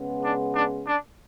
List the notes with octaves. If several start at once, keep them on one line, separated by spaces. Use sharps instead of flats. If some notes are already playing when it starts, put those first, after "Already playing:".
Already playing: C#3 G#3 B3
D4
D4
D4